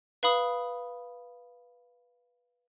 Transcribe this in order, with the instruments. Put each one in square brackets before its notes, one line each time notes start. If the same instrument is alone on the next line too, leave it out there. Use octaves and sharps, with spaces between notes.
[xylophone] B4 F5 B5 D#6